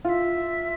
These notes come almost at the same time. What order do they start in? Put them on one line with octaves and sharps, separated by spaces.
F4 F#5 E5